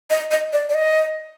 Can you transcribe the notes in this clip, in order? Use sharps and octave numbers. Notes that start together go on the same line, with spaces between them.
D#5
D#5
D5
D5
D#5